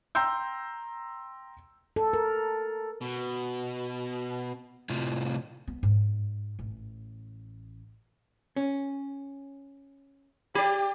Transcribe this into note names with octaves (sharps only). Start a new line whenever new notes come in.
G5 A#5 C6 E6 G6
A4
A#4
B2
A2 C3 F4
B3
G#2
A1
C#4
G4 D5 B5